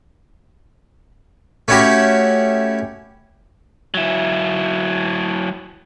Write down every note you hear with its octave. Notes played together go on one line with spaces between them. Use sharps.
A3 C#4 E4 F#4 G4
F#3 E4